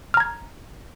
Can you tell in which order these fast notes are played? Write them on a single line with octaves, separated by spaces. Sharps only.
F6 A#5 G#6